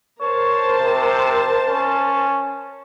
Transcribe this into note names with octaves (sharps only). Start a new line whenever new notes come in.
A#4 C5 C#5 A5
C3
C#4